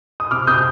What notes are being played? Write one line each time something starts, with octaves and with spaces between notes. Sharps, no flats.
D#6
C3 D6 F6
C3 D#6 G6